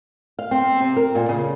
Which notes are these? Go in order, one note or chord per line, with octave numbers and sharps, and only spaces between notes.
F5
C4
C3
A#4
A#2
C#3